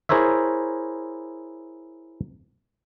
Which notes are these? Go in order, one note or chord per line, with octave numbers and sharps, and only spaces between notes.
E4 G#4 A#4 C5 C#5 E5